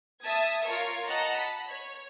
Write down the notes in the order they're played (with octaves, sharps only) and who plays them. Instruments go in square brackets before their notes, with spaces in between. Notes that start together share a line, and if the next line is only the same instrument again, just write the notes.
[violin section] E5 A5 D#6 G#6
F4 A#4 C#5 C#6
D#5 F#5 A5 A#5
B5
C#5